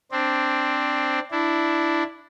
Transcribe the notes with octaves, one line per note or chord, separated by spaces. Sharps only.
C4 D4
D4 E4